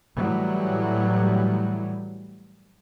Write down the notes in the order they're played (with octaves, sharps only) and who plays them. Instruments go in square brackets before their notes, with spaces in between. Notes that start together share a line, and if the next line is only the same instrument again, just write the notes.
[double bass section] A2 E3 F#3 G3